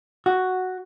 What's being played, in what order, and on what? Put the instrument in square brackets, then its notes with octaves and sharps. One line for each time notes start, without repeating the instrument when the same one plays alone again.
[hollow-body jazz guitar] F#4